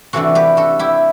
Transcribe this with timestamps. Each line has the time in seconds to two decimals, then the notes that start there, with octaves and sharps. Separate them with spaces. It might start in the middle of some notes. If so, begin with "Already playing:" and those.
0.13 C3 E3 A3 D4 F#4 A4
0.35 G4 B4
0.57 F#4 A4
0.79 E4 G4